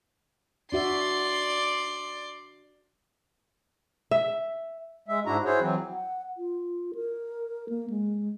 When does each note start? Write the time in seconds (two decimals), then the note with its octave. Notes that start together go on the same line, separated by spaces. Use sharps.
0.72 D4 F#4 D5 E5 C6
4.11 E5
5.08 G#3 E5
5.26 G#2 D4 E4 F#4 A#5
5.45 E4 F#4 G#4 C5 C#5
5.60 E3 F#3 C4
5.91 F#5
6.37 F4
6.95 A#4
7.69 A#3
7.90 G#3